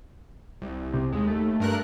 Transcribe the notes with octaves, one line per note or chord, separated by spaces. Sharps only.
C2
C3
D#2 G#3
A3
G2 A#4 F#6